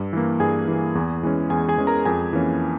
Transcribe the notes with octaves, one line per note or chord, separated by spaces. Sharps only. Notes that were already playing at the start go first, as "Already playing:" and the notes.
Already playing: G2
E3 A#3
G2 G#4 G#5
E3 A#3
E2
E3 G#3 C#4
E2 G#4 G#5
G#4 G#5
E3 G#3 C#4
A#4 A#5
F2 G#4 G#5
E3 A#3 C#4